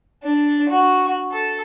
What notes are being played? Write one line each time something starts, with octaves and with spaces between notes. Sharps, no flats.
D4
F#4
A4